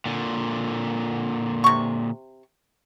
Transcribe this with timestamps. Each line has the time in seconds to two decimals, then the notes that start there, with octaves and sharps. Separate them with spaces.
0.06 A#2 D3
1.64 C3 C#6